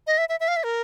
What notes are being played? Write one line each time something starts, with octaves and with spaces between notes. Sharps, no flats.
D#5
E5
E5
E5
F5
E5
A#4